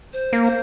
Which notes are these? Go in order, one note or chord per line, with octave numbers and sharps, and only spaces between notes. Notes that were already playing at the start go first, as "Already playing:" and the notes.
C5
A#3
C5